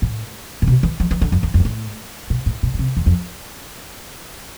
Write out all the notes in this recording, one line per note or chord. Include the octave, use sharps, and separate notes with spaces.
A2
A2
B2
E3
F3
E3
D3
F2
E2
F2
G2
A2
B2
A2
B2
B2
C3
E2
F2